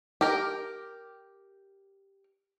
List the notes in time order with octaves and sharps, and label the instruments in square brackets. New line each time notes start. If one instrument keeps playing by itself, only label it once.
[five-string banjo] G4 A#4